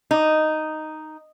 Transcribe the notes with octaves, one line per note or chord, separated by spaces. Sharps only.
D#4